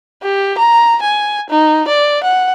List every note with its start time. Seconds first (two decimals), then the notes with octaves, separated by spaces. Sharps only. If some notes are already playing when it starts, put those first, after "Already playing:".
0.23 G4
0.58 A#5
1.02 G#5
1.50 D#4
1.88 D5
2.23 F#5